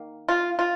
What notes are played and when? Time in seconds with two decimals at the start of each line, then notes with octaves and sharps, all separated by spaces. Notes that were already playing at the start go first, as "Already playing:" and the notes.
Already playing: D#3 A#3
0.29 F4
0.59 F4